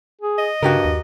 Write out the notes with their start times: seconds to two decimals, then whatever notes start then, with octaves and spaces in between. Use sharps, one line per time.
0.21 G#4
0.38 D#5
0.63 G2 C#3 F#4 G4 A#4
0.85 D#2